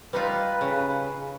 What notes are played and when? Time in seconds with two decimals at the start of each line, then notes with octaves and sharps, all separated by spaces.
0.13 G3 D#4 F4 B4
0.61 C#3